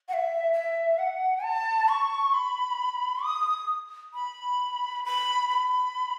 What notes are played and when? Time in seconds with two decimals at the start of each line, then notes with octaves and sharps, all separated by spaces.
0.09 F#5
0.13 E5
0.53 E5
0.98 F#5
1.44 A5
1.89 C#6
2.34 B5
3.24 D#6
4.14 B5
5.05 B5
5.49 B5